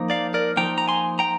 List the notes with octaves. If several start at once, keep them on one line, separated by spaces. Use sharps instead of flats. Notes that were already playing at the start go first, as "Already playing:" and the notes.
Already playing: F3 A#3 D#4
D5 F5
A#4 D5
F3 A#3 D#4 G5 A#5
A#5
G#5 C6
G5 A#5